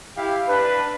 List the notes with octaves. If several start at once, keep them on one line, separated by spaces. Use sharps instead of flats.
E4 G4 F5
D4 B4